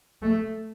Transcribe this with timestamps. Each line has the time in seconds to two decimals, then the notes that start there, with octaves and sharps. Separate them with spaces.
0.22 A3